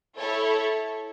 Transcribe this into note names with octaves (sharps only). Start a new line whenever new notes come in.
E4 A4 C#5